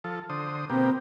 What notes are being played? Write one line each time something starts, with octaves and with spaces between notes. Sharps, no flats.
F3 A4
D3 C5 D#6
B2 A#3 C4 G4